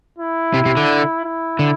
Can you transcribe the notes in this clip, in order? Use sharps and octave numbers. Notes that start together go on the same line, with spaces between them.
E4
C3
C3
D3
E4
D3